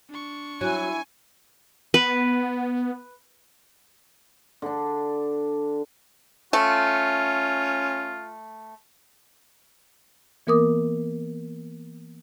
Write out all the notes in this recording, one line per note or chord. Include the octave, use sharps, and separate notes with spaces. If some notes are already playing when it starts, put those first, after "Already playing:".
D4 C#6
F#3 E4 G#5
B3 B4
D3 D4
A3 C#4 F4 A4
E3 A#3 B3 A#4 D6 D#6